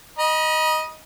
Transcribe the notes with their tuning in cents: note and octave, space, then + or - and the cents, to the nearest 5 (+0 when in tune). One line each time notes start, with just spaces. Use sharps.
D#5 +0 B5 -45